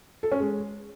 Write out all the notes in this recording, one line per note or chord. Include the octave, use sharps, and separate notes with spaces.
A4
C#4
G#3